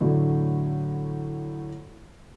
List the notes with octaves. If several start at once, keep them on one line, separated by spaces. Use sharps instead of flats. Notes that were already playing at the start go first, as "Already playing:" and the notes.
A2 D3 F#3 A3